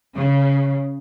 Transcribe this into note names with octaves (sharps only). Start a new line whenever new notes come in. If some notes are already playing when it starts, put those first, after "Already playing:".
C#3